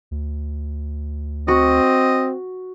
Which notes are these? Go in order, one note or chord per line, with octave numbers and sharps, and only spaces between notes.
D2
C4 F#4 D#5